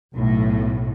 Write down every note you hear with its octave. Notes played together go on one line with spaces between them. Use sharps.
B1 A2